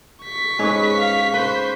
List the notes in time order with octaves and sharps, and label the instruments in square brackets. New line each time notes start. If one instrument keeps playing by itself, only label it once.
[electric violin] C#6 B6
[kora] G#2 C#4 [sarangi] B4
[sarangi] F5
[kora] B4 [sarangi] C5